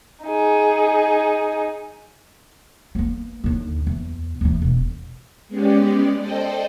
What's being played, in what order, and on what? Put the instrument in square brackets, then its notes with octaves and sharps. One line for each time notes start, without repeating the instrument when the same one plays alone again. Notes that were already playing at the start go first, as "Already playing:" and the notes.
[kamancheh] D#4 G#4
[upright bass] A#3 B3
D#2 D3
E2
D#2 E3
E1
[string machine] G#3 B3 C#4 G4 D5
A4 C5 D5 D#5 G5